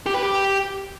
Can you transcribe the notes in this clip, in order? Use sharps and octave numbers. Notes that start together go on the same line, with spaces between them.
G4
B4
G4